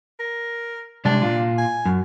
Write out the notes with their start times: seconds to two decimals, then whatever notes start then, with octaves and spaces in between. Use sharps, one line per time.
0.19 A#4
1.05 C3 G3 G#3 D4
1.22 A#2 F4
1.58 G#5
1.85 F#2